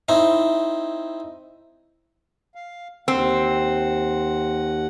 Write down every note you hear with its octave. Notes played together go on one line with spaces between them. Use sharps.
C4 D#4 E4
F5
D#2 C4 F#5